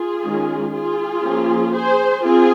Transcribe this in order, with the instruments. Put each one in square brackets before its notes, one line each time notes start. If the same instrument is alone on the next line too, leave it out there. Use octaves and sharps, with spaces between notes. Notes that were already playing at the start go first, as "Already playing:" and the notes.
Already playing: [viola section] F4 G#4
D#3 G#3 C#4
F4 G#4
F3 A#3 C#4
G#4 C5
C4 F4 G#4